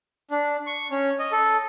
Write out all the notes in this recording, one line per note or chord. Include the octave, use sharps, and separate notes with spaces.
D4
C#6
C#4
D#5
A4